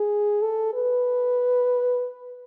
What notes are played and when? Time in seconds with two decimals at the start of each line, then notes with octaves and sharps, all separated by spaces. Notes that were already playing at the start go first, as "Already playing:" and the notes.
Already playing: G#4
0.42 A4
0.74 B4